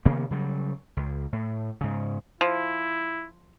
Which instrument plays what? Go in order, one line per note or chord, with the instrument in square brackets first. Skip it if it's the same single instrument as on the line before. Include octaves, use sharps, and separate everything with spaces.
[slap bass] C3 D#3 A#3 B3
C#3 F#3 G3
C#2
A2
G#2 C#3
[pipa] F3 [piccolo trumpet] E4